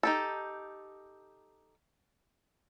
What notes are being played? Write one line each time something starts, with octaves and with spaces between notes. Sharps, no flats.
D#4 G4 A4